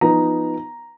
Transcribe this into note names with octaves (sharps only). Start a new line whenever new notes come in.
F3 B3 D#4 A#5